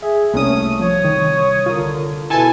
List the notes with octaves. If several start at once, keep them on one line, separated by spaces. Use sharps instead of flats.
G#4 E5
C2 A3 A#3 C#4 C#5 D#6
F3 C#5
D#3
D3 F4 A#4
B2 E4 A4 B4 G#5 A5